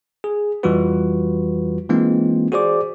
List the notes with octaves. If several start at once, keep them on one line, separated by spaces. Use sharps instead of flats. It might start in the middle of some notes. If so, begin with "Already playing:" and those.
G#4
F2 E3 G3 F4 F#4 B4
E3 G#3 A#3 C4 D#4 F4
F#4 G#4 C5 D5 D6